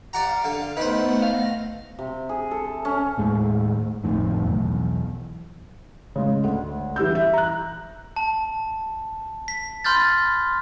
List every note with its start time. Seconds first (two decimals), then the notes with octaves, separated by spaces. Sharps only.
0.13 G4 D5 F5 F#5 A#5
0.45 D3
0.77 D#3 A3 B3 B4 C5 F#5
1.22 F5 A#6
1.99 C3
2.29 G#4
2.51 A4
2.85 C#4
3.17 D#2 A2 G#3
4.04 G1 F2 A2 D#3
4.44 B1 E2
6.16 C#3 G#3
6.44 D2
6.96 E3 G3 E6 G6
7.15 E5
7.33 A#5 F#6
8.16 A5
9.48 B6
9.84 B5 C6 F6 G6 A6